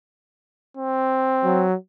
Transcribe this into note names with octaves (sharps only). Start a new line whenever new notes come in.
C4
F#3